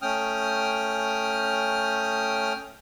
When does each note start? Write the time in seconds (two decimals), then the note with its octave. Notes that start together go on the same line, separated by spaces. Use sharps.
0.02 A3 C#4 G5 D#6 F6